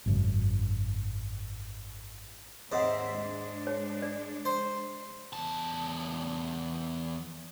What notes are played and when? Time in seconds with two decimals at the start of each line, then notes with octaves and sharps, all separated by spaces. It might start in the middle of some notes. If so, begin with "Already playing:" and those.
0.06 G#1 F#2 C#3
2.72 D#2 G#2 C4 C#5 D#5 E5 F#5
3.14 G#3 D4
3.67 C#5
4.02 D5
4.45 C5
5.33 E2 A5